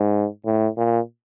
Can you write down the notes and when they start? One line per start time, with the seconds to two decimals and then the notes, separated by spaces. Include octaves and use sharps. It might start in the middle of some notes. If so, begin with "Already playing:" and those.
Already playing: G#2
0.46 A2
0.77 A#2